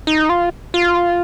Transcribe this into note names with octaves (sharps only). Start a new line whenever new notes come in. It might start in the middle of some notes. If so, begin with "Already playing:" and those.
D#4
F4
F4